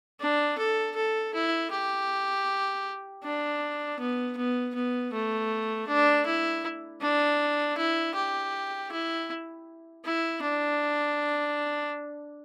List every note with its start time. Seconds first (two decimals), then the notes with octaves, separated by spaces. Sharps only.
0.20 D4
0.58 A4
0.95 A4
1.34 E4
1.71 G4
3.24 D4
3.99 B3
4.37 B3
4.74 B3
5.13 A3
5.87 D4
6.26 E4
7.01 D4
7.77 E4
8.15 G4
8.91 E4
10.05 E4
10.42 D4